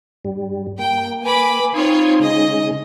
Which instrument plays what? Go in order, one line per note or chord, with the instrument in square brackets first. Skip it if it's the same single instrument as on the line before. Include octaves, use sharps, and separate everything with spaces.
[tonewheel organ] G2 G3
[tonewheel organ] A#3 [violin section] G5
[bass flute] B4 [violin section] G#5 B5 D6
[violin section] C4 F4 C#5 [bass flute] D#4 [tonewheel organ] C6 D#6 G#6
[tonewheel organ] C#3 G#3 [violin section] D#5